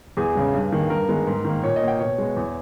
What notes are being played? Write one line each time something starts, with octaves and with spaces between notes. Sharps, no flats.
E2 G#4
C#3 G#3
G2
D#3 A#3
G2 A#4
D#3 G#3 B3
G#2
D#3 A#3
A#2 C#5
D#5
A#3
G5
B2 C#5
G#3 B3
E2